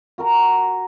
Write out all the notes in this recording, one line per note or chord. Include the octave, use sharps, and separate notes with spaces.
F#4 A#4 A#5